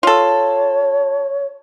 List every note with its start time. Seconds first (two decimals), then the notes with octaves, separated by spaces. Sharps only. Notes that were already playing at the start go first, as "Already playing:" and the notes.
0.03 F4 A4 C#5